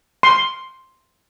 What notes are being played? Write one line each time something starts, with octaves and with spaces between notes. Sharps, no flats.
C6